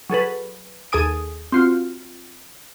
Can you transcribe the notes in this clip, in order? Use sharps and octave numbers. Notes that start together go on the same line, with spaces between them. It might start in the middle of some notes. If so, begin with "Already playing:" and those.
F#3 G#4 A4 B4
D#2 G#4 A4 G#5 D#6 D7
C4 F4 F#4